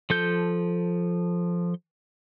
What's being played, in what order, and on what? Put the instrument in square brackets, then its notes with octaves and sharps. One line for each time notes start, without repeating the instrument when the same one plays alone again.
[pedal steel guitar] F3 A4 G6